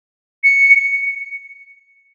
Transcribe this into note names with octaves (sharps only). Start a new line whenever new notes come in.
C#7